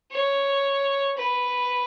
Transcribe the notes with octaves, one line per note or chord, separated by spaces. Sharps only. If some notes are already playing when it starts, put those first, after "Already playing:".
C#5
B4